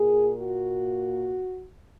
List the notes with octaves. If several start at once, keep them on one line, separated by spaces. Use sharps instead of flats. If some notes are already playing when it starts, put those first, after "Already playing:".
Already playing: A#2 A#3 G#4
F#4